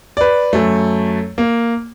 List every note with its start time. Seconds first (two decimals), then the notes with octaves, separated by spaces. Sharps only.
0.17 B4 D5
0.53 F#2 A3
1.38 A#3